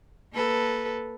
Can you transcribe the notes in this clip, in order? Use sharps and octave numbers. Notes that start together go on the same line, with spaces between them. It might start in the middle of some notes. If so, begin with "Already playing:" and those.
A#3 A4 B4